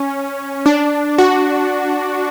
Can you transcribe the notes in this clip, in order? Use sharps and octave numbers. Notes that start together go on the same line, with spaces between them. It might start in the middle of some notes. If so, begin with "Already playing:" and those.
Already playing: C#4
D4
F#4